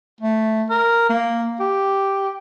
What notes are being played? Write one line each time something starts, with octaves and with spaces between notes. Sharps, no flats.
A3
A#4
A#3
G4